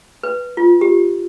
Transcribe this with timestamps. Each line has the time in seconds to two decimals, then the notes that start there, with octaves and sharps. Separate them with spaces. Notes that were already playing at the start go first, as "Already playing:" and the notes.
0.23 B4
0.57 F4
0.81 G4